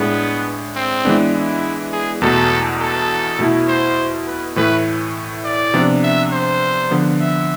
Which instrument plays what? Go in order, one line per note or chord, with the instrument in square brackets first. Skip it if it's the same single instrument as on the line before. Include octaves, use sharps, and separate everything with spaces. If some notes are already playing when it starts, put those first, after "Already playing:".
Already playing: [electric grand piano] A2 G#3 D4 G#4 [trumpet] B3
[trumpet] C4
[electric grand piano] E3 G#3 B3 D4
[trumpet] E4
G#4
[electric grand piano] E2 B2 A3 [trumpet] A4
[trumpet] A4
[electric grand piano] B2 A3 E4
[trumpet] C5
B4
[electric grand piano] A2 E3 A3 [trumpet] B4
[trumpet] D5
[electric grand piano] C3 F3 B3 D4
[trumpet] E5
C5
[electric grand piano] D3 F3 B3
[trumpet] E5